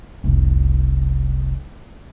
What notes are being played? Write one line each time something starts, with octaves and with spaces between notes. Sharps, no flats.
F1 C2